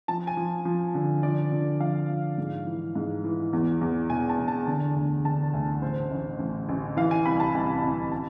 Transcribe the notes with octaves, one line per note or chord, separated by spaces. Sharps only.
F3 A5
G#5
F3
F3
D3
F3 D5
D3
F3 F5
F3
G#2
E3
G#2
E3
E2
E2
E1 G#5
A5
E1
A5
D3
D2
D3 A5
D2 G#5
A1 C5
A1
A1
A1
E3 F5
G#5
C2 B5
A5
C2 G#5
C2
A5